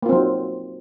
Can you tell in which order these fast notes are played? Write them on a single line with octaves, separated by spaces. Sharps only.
A#3 F4 C4 F#3 D#4